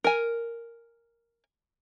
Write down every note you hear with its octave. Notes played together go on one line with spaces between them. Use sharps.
A#4 G#5